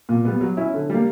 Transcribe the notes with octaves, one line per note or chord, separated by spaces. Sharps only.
A#2
G3 B3
F#3
C#4 E4
D3
G3 A#3